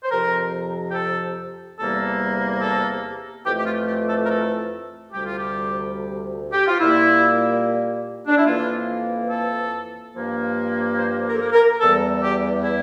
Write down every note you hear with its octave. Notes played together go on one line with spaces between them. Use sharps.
C5
F2 C3 F3 A#4
G4
A4
E2 C3 G3 A#3 A4
A4
F2 E3 A3 G4
G4
F4
G4
A4
A#4
A4
D2 C3 G3 G4
F4
G4
G4
F4
A#2 G3 A#3 E4
D4
E4
F2 E3 A#3 F4
A4
G2 F3 A#3
C5
A#4
A4
A#4
A#4
E2 E3 G3 A4
G4
E4